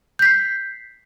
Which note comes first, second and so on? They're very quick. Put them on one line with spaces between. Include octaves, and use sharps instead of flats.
G6 B6 C7